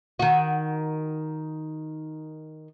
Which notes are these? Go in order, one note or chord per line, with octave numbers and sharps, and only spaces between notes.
D#3 F#4